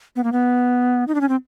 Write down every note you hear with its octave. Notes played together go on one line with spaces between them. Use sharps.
B3
A#3
B3
D#4
D4
C#4
C4